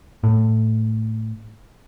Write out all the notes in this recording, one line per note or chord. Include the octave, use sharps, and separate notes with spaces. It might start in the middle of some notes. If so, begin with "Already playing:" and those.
A2